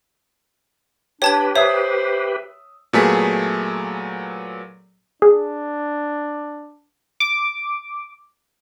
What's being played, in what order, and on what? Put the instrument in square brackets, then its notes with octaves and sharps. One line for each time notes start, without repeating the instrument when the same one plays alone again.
[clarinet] D4 [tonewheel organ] G4 B4 [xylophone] C#5 A5 G#6 [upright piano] G5
[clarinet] C5 [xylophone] C#5 [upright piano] E5 D#6
[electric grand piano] A#2 F#3 A3 B3 G#4 B6
[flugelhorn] D4 [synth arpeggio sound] G#4
[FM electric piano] D6